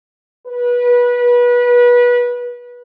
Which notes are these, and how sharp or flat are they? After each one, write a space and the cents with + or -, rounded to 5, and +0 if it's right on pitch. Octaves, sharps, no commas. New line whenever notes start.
B4 -25